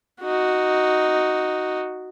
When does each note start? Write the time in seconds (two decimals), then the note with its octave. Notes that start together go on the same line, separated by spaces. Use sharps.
0.21 D#4 F#4